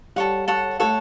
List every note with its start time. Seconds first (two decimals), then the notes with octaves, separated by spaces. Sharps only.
0.16 G3 A4 C#5 F#5
0.48 A4 C#5 F#5
0.80 A3 A4 C#5 F#5